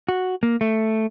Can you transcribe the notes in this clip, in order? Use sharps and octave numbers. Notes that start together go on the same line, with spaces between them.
F#4
A#3
A3